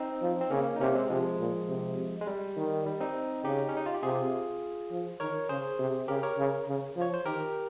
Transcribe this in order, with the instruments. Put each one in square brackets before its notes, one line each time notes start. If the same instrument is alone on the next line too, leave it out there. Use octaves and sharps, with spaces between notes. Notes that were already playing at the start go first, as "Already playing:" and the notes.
Already playing: [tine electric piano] C4 D#4
[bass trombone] F3
[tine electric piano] C4
[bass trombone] C#3 [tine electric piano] A#3 C#4
[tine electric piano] D#4
[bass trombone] C3 [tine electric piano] A#3 C#4
[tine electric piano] G#3 C4
[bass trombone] C3 [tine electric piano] F3 G#3
[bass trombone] A#2
C3
[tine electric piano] G#3
G3
[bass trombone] D#3
[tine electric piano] G3
C4 D#4
[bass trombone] C#3 [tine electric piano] D#4 G4
[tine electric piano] C#4
D#4
F4
G4
[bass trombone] C3 [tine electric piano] F4 G#4
[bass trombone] F3
[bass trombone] D#3 [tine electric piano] A#4 C#5
[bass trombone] C#3 [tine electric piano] G#4 C5
[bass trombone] C3
[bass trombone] C#3 [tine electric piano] G4 A#4
[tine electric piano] A#4 C#5
[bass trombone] C#3
C#3
F3
[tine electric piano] C#5
C5
[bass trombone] D#3 [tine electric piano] G4 A#4